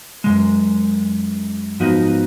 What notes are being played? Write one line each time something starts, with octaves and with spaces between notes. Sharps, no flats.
F#2 C#3 G#3
G#2 F3 B3 D#4 F#4